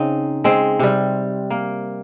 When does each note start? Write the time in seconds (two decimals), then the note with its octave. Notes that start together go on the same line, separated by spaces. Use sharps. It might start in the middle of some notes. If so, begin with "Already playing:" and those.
Already playing: C#3 C4 D#4
0.44 G#3 C4
0.79 C3 G3
1.50 A#3